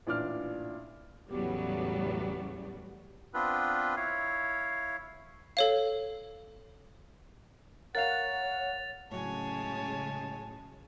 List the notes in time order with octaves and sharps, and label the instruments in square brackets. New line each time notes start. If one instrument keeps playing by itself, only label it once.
[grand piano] A1 A#2 D4 D6 F6
[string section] E2 A2 C#3 F#3 G3 B3
[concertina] B3 C4 D4 F4 B4
E4 C#5 F5
[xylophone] A4 C#5 F5
[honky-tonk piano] A#4 F5 [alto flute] C#5 [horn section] F#5 [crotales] A6 F7
[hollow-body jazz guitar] A2 F#3 [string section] C#3 G#3 [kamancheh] C#5 G#5 [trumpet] A5